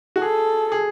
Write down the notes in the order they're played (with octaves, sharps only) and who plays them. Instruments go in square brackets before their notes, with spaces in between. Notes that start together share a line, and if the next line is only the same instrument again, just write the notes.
[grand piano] F#4
[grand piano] G#4 [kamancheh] A4
[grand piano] G#4